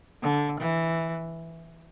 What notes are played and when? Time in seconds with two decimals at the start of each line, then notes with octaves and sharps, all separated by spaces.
0.23 D3
0.60 E3